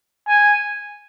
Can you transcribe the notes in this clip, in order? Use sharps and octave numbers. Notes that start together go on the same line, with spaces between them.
G#5